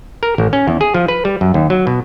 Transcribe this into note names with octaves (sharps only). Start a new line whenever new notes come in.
A#4
A1
C#4
E2
G#4
F3
B4
G3
F#2
D#2
F#3
B2